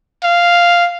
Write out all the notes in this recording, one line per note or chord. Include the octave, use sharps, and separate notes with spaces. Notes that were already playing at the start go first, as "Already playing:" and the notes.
F5